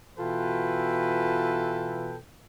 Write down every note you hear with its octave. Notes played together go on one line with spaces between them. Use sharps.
B2 E3 F4 A4 B4 G5